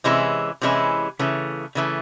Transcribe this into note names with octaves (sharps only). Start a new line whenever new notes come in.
C3 E3 G#3 C#4 E4
C3 E3 G#3 C#4 E4
C#3 E3 A3
C#3 E3 A3